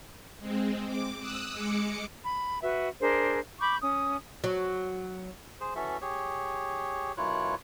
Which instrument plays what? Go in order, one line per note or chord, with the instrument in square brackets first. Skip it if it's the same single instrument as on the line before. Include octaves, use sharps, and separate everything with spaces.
[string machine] G#3 C4
D6
D#6 E6 F#6
G#3 D6 C#7
[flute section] B5
F#4 B4 E5
D4 G#4 A#4 C5
B5 C#6 D6 G6
C#4 D#6
[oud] F#3
[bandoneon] G#4 C5
E3 C#4 F#4 A4 E5
G4 G#4 C#5
F#2 B2 E4 F4 C#5 F#6